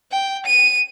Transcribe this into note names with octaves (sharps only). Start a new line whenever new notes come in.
G5
D#7